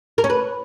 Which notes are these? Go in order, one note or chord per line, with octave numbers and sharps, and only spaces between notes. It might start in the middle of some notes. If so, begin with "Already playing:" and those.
A#4
C#4
B4